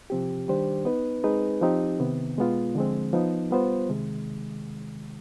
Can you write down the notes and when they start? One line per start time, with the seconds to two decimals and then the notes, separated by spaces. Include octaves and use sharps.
0.10 C3 F3 C4 G4
0.48 D#3 G3 D4 G4 C5
0.85 B3 D#4 B4
1.24 G#3 C4 D#4 G#4 B4
1.61 F3 C4 D#4 G4
2.00 C3 D#3 B3
2.38 B2 G#3 B3 F4
2.75 D3 F3 G#3 C4
3.13 F3 B3 D#4
3.51 G3 B3 F4 C5
3.89 C3 D#3 G#3